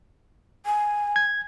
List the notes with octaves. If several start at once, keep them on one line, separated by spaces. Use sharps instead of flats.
G#5
G#6